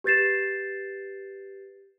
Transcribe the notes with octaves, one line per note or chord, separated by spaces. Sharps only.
G4 B4 G6 A6 C7 E7